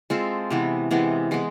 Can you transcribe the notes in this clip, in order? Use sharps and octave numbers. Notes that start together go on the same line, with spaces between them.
G#3 C4 F4 A4
C3 E3 B3
C3 E3 G#3 B3
E3 G#3 B3